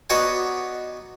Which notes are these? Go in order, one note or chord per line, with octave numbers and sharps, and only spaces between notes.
B3 D#4 F#4 C#5 D5 G#5